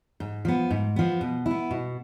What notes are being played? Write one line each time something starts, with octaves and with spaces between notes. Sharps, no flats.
G#2
F3 B3
G#2
F3 B3
B2
B3 E4
B2